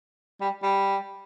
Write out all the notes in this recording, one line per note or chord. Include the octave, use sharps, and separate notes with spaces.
G3
G3